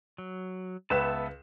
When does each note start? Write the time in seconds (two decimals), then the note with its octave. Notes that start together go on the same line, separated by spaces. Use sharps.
0.18 F#3
0.90 C#2 B3 B4 E5 A5 E7